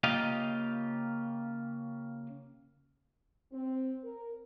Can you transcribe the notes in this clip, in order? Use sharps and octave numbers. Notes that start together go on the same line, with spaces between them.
C#3 A#3 F4 G4 D#5 F5
C4
A#4